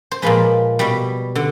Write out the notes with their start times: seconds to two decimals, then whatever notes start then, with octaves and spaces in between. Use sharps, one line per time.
0.11 C5
0.22 A#2 F3 G#3 B4
0.79 B2 G3 B4
1.35 D3